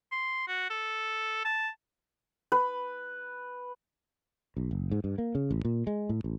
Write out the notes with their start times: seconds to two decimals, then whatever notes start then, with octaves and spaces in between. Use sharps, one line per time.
0.12 C6
0.48 F#4
0.70 A4
1.45 A5
2.52 B4
4.57 B1
4.71 F#1
4.91 G#2
5.04 G2
5.18 A#3
5.35 C#3
5.51 A1
5.65 A#2
5.87 G#3
6.09 A2
6.24 A1